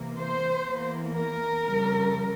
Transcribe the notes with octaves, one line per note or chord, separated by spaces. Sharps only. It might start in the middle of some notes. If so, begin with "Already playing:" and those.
Already playing: C3 E3 A#3
C5
E2 E3 A#3
A#4
F2 C#3 G3